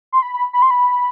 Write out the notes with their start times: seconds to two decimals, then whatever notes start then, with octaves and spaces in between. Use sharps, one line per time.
0.12 C6
0.22 B5
0.34 B5
0.53 B5
0.62 C6
0.71 B5